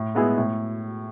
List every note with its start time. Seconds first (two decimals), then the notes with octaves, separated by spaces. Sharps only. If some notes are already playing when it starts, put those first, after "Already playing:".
Already playing: A2
0.15 G#3 B3 E4 G#4
0.38 A2